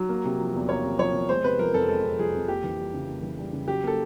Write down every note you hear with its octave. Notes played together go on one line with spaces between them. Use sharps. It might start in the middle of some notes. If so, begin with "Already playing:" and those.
Already playing: F#3
A#3
C3
F3
E2
A#3 C#5
C3
F3 C#5
E2
G#3 C5
C3 B4
F3 A#4
F2 A4
G#3 A4
C3
F3 G#4
F2
A#3 G4
E3
G3
C#3
A#3
E3
G3
C#3
F#3 G4
A#3 A4